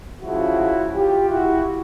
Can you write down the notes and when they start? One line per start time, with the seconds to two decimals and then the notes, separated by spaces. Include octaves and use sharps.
0.21 C#2 C#3 F3 E4 F#4
0.93 F4 G4
1.29 E4 F#4